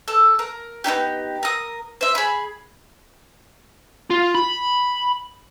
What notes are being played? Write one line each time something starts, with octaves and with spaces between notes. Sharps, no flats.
A4
A#4
B3 D4 D#4 G4
A#4 D#6
C5 E5
G#4 B5
F4
B5